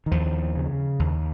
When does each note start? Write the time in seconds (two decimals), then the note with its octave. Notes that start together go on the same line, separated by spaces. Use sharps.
0.06 D#3
0.11 D#2 F3
0.56 C#3
0.99 D#2